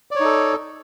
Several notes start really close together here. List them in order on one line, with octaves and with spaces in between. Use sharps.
D5 C#5 D#4 A4